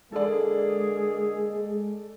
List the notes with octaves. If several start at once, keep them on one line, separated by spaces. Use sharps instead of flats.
D3 G#3 A#3 G#4 A4 D5